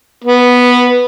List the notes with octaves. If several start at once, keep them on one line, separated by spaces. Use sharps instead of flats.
B3